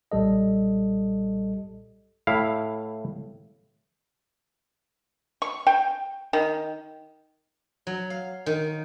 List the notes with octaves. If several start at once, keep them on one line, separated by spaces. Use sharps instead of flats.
B1 A#2 G3 A4 D#5
A2 E4 F5
C#6
G5
D#3
F#3
F5
D#3